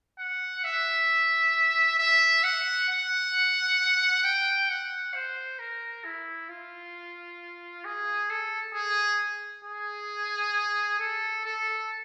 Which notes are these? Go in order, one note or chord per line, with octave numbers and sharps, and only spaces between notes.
F#5
E5
E5
F#5
F#5
G5
F#5
C5
A#4
E4
F4
G#4
A4
G#4
G#4
A4
A4